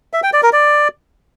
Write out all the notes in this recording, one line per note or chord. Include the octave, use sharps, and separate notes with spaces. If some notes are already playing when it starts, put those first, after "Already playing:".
E5
G5
D5
A#4
D5